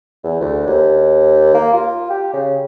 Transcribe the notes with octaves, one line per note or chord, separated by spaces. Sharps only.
E2
D2
D#2
A#3
F4
G4
C#3